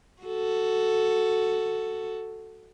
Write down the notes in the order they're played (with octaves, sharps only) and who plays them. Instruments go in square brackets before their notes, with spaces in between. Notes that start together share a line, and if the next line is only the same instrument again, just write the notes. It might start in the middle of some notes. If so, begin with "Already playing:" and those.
[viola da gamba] F#4 A4